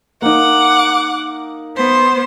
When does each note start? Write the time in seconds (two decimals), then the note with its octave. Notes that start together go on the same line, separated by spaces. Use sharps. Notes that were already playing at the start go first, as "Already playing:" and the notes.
0.22 A#3 D#4 F#5 D6
1.75 B3 C5